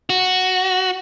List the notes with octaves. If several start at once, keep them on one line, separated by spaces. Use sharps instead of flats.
F#4